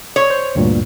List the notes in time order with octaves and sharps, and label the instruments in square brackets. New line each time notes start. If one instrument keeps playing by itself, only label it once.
[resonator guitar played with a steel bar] C#5
[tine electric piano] C5
D2 G2 A#2